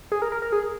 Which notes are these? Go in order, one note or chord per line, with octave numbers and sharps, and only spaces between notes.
G#4
A#4
A#4
A#4
G#4